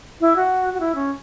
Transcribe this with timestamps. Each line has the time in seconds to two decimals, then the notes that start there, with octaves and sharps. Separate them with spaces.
0.21 E4
0.36 F#4
0.74 F#4
0.80 E4
0.95 C#4